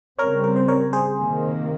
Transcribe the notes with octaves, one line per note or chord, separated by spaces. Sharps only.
C#3 G3 C4 A#4 C#5
A#4
C5
A#4 C#5
G#4 C5
C3 D#3 A#3